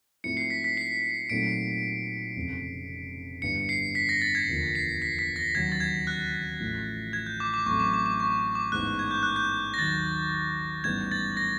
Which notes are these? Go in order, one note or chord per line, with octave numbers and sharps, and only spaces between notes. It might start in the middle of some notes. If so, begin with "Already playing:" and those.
G#2 F3 A3 C4 E4 C#7
C7
B6
B6
C7
A#2 F#3 A3 C4 D#4 D7
F1 F2 C#3
G1 G2 E3 C#7
C7
B6
A#6
A6
G#6
E1 D2 D3 F3 A#3
C7
B6
B6
A#6
D#2 C#3 F#3 G#6
A6
G#6
F#6
A1 A2 F3
G#6
G6
D6
D6
A1 A2 F#3 A3 C4 C#6
D6
D6
D6
C#6
D6
A1 G#2 E3 G#3 B3 F#6
G#6
G6
F#6
G6
A#6
D#2 D#3 F#3 A6
A1 G#2 E3 G3 B3 G#6
A6
A#6